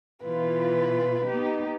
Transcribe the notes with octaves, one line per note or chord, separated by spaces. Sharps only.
B2 E3 F4 B4
B3 D#4 G4